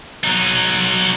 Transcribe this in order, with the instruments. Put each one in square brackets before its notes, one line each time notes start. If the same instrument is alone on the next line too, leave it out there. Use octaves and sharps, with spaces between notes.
[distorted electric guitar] F#3 D#4